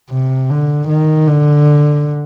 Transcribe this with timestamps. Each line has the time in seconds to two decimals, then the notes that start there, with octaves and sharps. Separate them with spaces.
0.11 C3
0.50 D3
0.89 D#3
1.27 D3